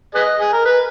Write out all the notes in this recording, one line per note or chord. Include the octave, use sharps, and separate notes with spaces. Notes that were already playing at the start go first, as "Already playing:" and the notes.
G#4 B4 D#5
G#4
A#4
B4